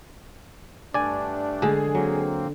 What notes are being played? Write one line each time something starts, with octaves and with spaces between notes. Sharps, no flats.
G2 A3 D4 D5 G#5
D3 G#3 G#4
F#3 A#3 C4